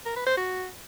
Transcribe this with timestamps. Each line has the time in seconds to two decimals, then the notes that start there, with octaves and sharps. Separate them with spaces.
0.05 A#4
0.16 B4
0.26 C5
0.37 F#4